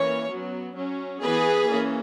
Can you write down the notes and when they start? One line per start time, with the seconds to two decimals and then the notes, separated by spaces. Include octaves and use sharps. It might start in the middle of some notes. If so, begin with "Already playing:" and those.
Already playing: E3 A#3 C#4 C#5
0.30 F#3 B3
0.75 F#3 C#4
1.21 E3 B3 G#4 B4
1.66 E3 A#3 C#4